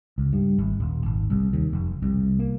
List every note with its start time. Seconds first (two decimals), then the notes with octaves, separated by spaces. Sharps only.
0.18 C#2
0.33 G2
0.58 G#1
0.80 D#1
1.06 G#1
1.30 C2
1.53 D#2
1.73 F1
2.02 C2
2.39 A#3